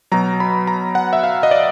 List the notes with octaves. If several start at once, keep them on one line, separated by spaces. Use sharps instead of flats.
B2 F#3 A#5
B5
A#5
F#5
E5
F5
D#5
D5